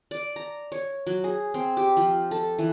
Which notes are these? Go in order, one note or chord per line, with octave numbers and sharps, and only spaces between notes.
D5
A#5
C#5
F#3
G#4
C4
G4
F3
A4
E3